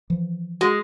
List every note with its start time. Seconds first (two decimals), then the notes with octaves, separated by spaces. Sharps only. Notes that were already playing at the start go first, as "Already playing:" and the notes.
0.10 E3 F3
0.61 G#3 F#4